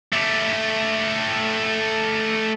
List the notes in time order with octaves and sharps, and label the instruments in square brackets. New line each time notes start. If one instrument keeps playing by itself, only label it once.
[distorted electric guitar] A3 G4